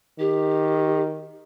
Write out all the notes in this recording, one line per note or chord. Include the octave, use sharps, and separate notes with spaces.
D#3 G4